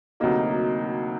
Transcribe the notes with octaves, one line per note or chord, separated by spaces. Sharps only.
D2 C3 F#3 A#3 D#4